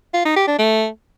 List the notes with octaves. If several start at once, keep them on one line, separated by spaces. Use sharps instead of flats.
F4
D#4
G4
D4
A3